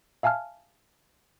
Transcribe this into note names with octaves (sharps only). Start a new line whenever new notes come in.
E5 F5 G#5 A5 F6